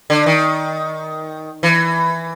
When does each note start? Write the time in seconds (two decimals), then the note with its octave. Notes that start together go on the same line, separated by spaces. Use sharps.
0.10 D3
0.26 D#3
1.63 E3